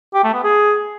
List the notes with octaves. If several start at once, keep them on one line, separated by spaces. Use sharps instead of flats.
G4
A3
B3
G#4